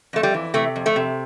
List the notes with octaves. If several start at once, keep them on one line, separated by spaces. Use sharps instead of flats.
F2 A3
G3
E3
C3 A3
F2
A3
C3